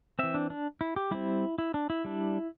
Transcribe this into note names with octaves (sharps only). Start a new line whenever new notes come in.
E3 C4 E5
D4
D4
E4
G4
G3 C4 E4
E4
D4
E4
G3 D4